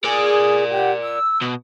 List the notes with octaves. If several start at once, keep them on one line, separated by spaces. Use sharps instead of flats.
G#4 A#4 D5
G4 F#5
E6
B2